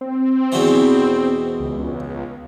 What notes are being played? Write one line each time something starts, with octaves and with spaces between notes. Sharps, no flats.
C4
E2 B2 E3
C#2